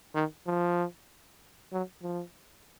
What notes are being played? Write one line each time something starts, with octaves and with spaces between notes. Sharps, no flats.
D#3
F3
F#3
F3